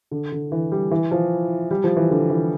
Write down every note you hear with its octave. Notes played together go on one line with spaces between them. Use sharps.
D3
D3
E3
G3
E3
F3
G3
F3
E3
D3
E3